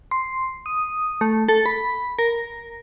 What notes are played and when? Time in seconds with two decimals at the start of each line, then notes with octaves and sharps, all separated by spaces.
0.11 C6
0.66 D#6
1.21 A3
1.49 A4
1.66 B5
2.19 A#4